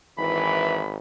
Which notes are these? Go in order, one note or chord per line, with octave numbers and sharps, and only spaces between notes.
G#1 E3 B5